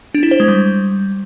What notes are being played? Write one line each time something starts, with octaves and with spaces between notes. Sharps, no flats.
D4
E4
C5
G#3
G3